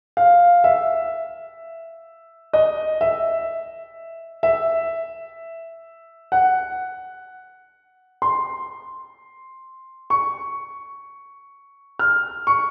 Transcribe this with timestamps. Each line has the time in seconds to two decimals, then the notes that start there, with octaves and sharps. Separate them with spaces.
0.17 F5
0.64 E5
2.53 D#5
3.01 E5
4.43 E5
6.32 F#5
8.22 C6
10.10 C#6
11.99 F6
12.47 C#6